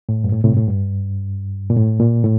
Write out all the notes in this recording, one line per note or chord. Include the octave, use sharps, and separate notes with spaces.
A2
G2
A2
A2 C3
G2
A2
G2
A#2
A2
A#2
A2